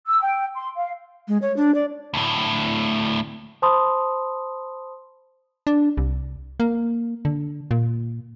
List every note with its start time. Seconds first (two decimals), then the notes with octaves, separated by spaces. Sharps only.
0.06 E6
0.21 G5
0.55 C6
0.76 F5
1.28 G#3
1.42 C#5
1.57 D4
1.75 D5
2.14 D2 A2
3.62 C5 A5 B5 C6 D#6
5.67 D4
5.97 C2
6.60 A#3
7.25 D3
7.71 A#2